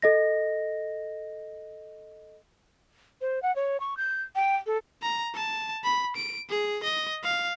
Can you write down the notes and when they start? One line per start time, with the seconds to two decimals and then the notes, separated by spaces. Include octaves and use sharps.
0.02 A4 D#5 A#6
3.21 C5
3.42 F#5
3.56 C#5
3.80 C#6
3.97 G6
4.35 G5
4.66 A4
5.02 A#5
5.35 A5
5.84 B5
6.16 D7
6.50 G#4
6.84 D#5
7.24 F5